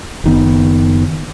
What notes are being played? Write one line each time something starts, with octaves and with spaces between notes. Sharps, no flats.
F#1 D#3 B3